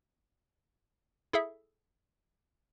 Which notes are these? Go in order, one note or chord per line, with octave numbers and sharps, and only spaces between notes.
E4 G#4 A4 E5